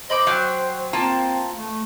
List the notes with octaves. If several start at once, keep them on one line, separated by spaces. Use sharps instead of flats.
C5 D#5 B5 D6
F#3 F5 G5 G#5
A#3 C4 F4 A5
A3